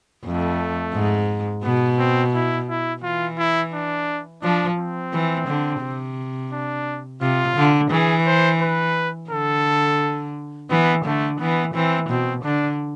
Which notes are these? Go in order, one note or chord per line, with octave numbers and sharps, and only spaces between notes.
F2 A3
G#2
B2 B3
C4
E4
E4
E3 F4
E4
D4
F3 D4
C4
E3
D3
C3
D4
C3 F4
D3
E3 G#4
C5
B4
D3 A4
E3 B3
D3 A3
E3 B3
E3 C4
B2 C4
D3 D4